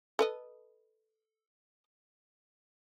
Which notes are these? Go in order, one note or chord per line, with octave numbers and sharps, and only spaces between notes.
A4 B4 D#5